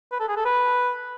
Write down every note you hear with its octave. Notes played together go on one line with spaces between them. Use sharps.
B4
A4
G#4
A4
B4